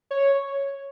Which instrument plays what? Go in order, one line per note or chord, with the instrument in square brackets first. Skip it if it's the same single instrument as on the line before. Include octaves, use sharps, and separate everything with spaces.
[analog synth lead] C#5